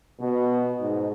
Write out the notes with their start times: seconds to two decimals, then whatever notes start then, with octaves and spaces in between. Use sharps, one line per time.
0.20 B2
0.80 G#2